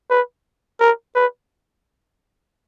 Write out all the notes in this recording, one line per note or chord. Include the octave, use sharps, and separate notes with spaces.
B4
A#4
B4